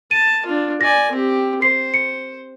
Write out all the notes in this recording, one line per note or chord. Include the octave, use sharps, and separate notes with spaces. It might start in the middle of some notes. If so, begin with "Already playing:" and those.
A5 D#7
D4 F4
D5 G#5 A#6
C4 G4
C5 C7
C#7